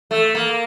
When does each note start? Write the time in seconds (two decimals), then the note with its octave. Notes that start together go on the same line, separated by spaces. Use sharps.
0.11 A3
0.35 A#3